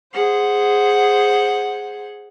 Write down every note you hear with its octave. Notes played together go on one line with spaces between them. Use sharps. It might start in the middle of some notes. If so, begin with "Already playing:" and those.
G#4 C5 F#5